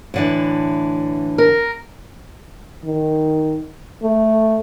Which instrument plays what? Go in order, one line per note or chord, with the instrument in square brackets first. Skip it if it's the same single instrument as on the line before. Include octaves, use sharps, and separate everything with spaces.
[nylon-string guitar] A2 D3 E3
[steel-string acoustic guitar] A#4
[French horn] D#3
A3